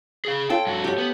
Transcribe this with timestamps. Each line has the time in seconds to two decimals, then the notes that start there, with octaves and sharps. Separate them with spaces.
0.25 G#4 F5
0.50 F4 A4 C#5 G5
0.67 G2 F#4
0.84 G4 C#5
0.98 B3